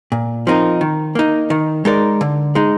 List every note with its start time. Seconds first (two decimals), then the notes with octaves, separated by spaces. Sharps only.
0.12 A#2
0.47 F3 C4 D#4 A#4
0.81 D#3
1.15 A#3 D#4
1.50 D#3
1.85 G#3 D#4 A#4 D5
2.21 D3
2.55 G#3 D#4